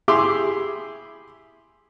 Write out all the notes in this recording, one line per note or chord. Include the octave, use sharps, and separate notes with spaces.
E4 G4 G#4 E5 C6 D6